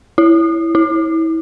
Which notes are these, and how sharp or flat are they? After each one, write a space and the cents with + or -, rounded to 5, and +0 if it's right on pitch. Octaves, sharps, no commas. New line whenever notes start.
E4 +5
E4 -25